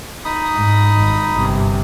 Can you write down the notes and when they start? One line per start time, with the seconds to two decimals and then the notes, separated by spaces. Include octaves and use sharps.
0.25 D#4 B5 D#6
0.54 G#2
0.95 G#1 G#2
1.32 G1 C3